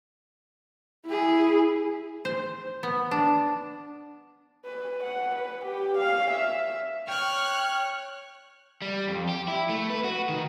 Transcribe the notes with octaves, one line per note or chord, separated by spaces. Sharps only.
E4 G#4
C5
B3
D4
B4
F#5
B4
G4
F5
E5
C#5 G5 C#6 F6 F#6
G3
F2
G4
E4
A3
B4
F#4
D#3